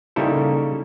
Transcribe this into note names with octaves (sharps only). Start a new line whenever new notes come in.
C#3 G3 A#3 D#4 E4 A4